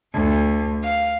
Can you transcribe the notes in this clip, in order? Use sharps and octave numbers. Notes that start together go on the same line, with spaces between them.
D2
F5